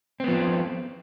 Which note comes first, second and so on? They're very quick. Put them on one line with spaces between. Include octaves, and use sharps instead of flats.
C4 B3 F3